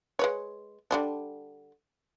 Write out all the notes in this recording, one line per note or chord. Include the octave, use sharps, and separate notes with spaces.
G#3 B4 C#5
D3 G3 D4